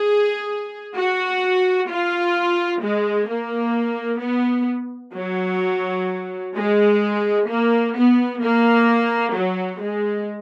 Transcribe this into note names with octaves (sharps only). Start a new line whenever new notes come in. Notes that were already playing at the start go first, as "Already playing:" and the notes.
Already playing: G#4
F#4
F4
G#3
A#3
B3
F#3
G#3
A#3
B3
A#3
F#3
G#3